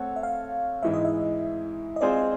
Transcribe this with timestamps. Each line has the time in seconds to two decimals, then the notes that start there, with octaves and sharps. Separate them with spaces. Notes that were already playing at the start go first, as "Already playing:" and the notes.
Already playing: A3 C4 A4 C#5 F#5
0.16 E5
0.23 F5
0.83 G#2 E3 G#3 E5
0.93 D#5
1.05 E5
1.96 D#5
2.01 G#3 C4 F4 G#4 C5 D5
2.16 D#5